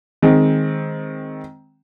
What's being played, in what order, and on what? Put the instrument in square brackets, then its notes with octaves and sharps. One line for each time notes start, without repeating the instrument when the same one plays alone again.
[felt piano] D#3 G#3 C4